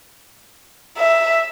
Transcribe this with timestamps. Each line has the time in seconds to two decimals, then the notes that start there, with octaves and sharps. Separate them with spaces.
0.98 E5